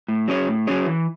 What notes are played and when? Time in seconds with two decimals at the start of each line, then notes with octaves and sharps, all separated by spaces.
0.08 A2
0.28 F#3 C#4 G#4 C#5
0.48 A2
0.67 F#3 C#4 G#4 C#5
0.87 E3